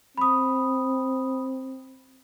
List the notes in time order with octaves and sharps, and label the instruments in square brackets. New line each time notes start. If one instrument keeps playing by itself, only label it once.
[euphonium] C4 [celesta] B5 D#6